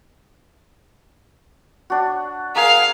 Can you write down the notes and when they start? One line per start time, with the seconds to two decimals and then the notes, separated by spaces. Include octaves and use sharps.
1.90 D4 F#4
2.56 G#4 A#4 F5 A#5